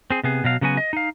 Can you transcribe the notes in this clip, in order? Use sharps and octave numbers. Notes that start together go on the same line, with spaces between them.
C4 G#4
C3 B3 G#4
B2 F#3 F5
C#3 F#3 B3 F#4 G#5
D#5
D#4 F5